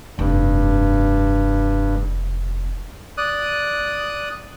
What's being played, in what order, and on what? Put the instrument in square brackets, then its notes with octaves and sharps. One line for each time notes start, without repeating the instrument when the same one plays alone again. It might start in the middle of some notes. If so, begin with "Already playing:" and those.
[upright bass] F1 [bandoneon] G2
[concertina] D5 D#6 F#6